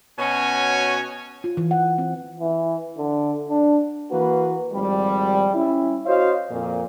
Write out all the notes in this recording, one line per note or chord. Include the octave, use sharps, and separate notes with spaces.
B2 C#4 F#4 C#5 G#5
F4
E3
F#5
C4
E3
D3
D4
E3 A#3 F#4 B4
G#1 F3 G3
C#4 E4
F#4 C5 C#5 D#5 F5
F2 A#2